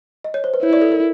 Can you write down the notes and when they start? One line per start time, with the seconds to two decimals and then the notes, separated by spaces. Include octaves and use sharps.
0.24 D#5
0.34 C#5
0.44 C5
0.54 B4
0.62 E4 C#5
0.73 D5
0.82 A4
0.92 A#4